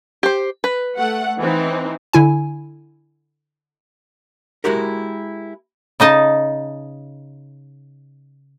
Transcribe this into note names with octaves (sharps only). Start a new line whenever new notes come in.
G4 C5
B4
A3 F#5
E3 C4 D#4
D3 E4 G#5
G#3 E4 F#4 G4 A#4
C#3 D#4 D#5 A5